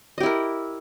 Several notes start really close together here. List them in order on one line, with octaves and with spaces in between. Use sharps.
D#5 G4 E4 A#4